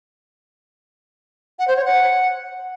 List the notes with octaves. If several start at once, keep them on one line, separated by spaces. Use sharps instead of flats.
F#5
C5
C#5
F#5